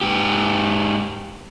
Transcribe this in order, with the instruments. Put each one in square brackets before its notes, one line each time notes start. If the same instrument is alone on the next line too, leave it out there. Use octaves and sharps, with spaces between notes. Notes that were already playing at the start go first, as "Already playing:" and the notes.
[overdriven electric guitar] G#2 G4